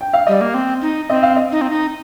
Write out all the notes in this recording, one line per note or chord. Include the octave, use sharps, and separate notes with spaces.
G5
F5
G3 D#5
A#3
C4
D#4
C4 D#5
F5
D#5
D#4
C4
D#4